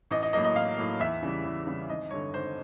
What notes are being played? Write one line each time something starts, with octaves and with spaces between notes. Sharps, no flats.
A1 D#5
D#5
A2 F#3 A#3 D#5
D#5
A1 F5
A2 F#3 A#3
E2 E5
C#3 E3 G3
E2
C#3 E3 G3
G#1 D#5
G2 D3 C#5
G#1 C5